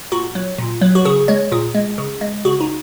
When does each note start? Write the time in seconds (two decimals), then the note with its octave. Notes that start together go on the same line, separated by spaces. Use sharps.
0.12 A#2 F#4
0.35 F#3
0.59 A#2
0.81 F#3
0.95 F#4
1.05 C#3 G#4
1.28 G#3 C#5
1.52 A#2 G#4
1.75 G#3
1.98 C#3
2.21 G#3
2.45 C#3 F#4
2.61 D#4